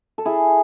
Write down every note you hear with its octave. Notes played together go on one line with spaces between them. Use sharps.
A4
E4 G#4